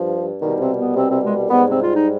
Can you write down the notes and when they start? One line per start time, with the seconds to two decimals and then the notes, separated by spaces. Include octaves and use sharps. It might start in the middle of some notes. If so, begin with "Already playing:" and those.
Already playing: G2 F3
0.41 C2 B2 D#3 G3 D#4
0.59 C3 C4
0.78 B3
0.95 C3 C4
1.09 C3 C4
1.24 G#3
1.50 G#2 G3 B3
1.68 C3 C4
1.80 F4
1.93 D#4